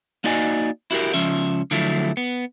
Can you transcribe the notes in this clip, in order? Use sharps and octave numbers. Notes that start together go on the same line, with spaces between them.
A#3 D#4 F#4 D5 D#5 G#5
E4 F#4 G4 A#4
C#2 F3 C#4 E5
D3 F3 F#3 A3 E4
B3